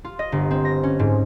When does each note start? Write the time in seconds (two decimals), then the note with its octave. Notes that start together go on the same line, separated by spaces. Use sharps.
0.04 F4
0.19 D#5
0.32 G1
0.51 C4
0.65 A#6
0.83 C#4
0.99 G#2